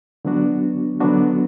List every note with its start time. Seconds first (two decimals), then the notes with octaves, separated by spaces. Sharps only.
0.25 D3 F#3 B3 D4 F#4
1.00 D3 F#3 B3 D4 F#4